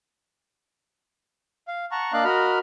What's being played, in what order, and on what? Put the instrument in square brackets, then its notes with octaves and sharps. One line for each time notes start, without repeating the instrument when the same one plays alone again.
[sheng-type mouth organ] F5
F#5 A5 A#5 C#6
A#3 D4 D5 D#5 F5 F#6
F#4 A#4 D#5 B5 F6